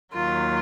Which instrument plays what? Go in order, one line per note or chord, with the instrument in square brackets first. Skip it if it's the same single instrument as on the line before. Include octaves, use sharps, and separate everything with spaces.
[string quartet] D#2 D#3 F#3 F4